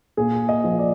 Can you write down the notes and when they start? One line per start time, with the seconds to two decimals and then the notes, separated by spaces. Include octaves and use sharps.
0.17 A#2 G#4
0.49 D#5
0.64 F3
0.79 D5